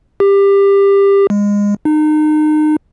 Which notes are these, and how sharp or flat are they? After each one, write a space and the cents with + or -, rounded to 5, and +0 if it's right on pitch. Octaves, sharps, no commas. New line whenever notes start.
G4 +20
G#3 -25
D#4 -30